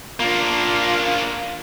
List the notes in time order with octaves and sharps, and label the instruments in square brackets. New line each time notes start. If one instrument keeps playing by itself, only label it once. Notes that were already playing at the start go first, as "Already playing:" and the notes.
[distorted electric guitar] A#3 D4 [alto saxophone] F4